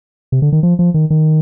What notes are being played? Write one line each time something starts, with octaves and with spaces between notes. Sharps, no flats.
C3
D3
D#3
F3
F3
D#3
D#3